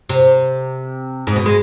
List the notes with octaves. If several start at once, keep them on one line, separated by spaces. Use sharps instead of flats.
C3
G#2
B2
G#3